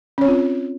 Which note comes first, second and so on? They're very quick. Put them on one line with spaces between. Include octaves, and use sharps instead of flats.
C#4 C#5 C4 F4